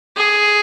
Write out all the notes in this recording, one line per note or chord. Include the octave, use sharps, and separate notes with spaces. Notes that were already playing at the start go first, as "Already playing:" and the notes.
G#4